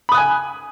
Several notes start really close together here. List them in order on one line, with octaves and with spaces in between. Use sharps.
B5 D#6 F#6 G#5